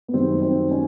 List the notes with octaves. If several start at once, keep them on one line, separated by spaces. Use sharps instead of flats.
B3
F#2 D#3 G3 C4
C4
C#4